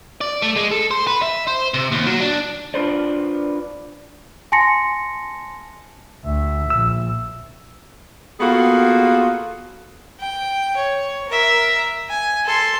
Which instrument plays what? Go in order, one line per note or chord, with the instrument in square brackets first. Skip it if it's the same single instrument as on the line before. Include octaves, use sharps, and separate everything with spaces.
[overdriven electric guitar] D5
A3
G#3
A4
C5
B4
E5
C5
C3
D#2
F#3
D4
[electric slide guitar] D4 F4 B4 C5 D5
[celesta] G#5 A5 C6 A#6 C#7
[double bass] D2 [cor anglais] E5
[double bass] A#1 [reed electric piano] E6
[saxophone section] A#3 B3 F4 F#4 G#4 A4
[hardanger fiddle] G5
C#5
A#4 E5
G#5
A4 C6